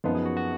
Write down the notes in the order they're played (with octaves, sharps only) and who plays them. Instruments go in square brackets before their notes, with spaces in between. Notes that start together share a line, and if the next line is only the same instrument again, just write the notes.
[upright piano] F#2 F3 B3 D#4 [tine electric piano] F4
[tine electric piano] G#4
F#4
F#4